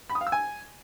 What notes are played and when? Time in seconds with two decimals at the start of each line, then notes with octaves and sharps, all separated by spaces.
0.10 B5
0.15 D#6
0.21 F5
0.27 E6
0.32 G#5